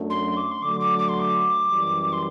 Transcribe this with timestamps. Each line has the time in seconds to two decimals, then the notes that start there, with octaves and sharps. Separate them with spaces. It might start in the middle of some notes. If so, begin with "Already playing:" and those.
Already playing: F#2 F#3 A3 D4
0.10 C6
0.37 D6
0.51 C6
0.62 D3 F#3 A3 D6
0.80 D6
0.99 D6
1.09 C6
1.20 D6
1.70 F#2 E3 G3
2.13 C6